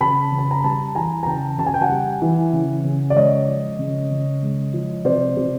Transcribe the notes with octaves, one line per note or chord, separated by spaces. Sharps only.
C#3 A5 B5
C#3
A5
A#5
G3 A5 B5
E3 G#5 A#5
A#5
C#3 G5 A5
C#3 A5
G#5
G5
F#5 G#5
G3
E3
C#3
C#3
D5
G#3 C#5 D#5
F3
C#3
C#3
G#3
F3
C3 C5 D5
C3